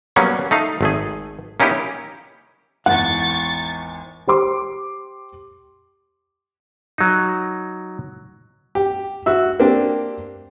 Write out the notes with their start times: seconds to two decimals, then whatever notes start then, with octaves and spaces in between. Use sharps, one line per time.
0.16 F#3 G3 A#3 B3 C#4
0.51 A3 D#4 F5
0.81 G#1 A3 G#4
1.60 A#3 C#4 D#4 E4 G4
2.86 G#1 E2 F#5 C#6 A6
4.27 G4 C5 C6 D6
6.98 F#3 D#4
8.75 G4
9.26 F#4 E5 E6
9.60 A#3 C4 D4 G4